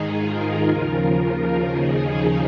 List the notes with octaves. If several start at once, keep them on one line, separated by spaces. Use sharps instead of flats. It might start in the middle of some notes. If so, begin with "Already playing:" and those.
Already playing: G#2 D#3 D#4 G#4
F4 A#4
D#2 C#3 F3
F4 A#4
D#2 C#3 F3 D#4 G#4